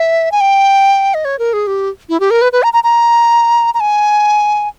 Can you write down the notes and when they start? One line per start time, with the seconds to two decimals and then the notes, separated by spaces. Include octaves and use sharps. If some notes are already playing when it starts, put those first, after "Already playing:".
Already playing: E5
0.32 G#5
0.41 G5
1.14 D#5
1.25 C#5
1.39 A#4
1.53 G#4
1.67 G4
2.09 E4
2.20 G4
2.31 A#4
2.42 B4
2.52 B4
2.63 A#5
2.73 A#5
2.84 A#5
3.74 A#5
3.80 G#5